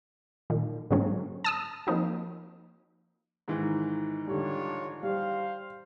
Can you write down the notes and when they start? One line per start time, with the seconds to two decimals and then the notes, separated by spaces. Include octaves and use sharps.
0.50 A#2 D#3
0.91 G#2 D3 F#3 A#3 C4 C#4
1.44 A5 D#6 E6
1.87 F3 A#3 C4 D#4 F#4
3.48 G#2 D#3 E3
4.27 D3 G3 D4 F4 C#5
5.03 G3 C5 F5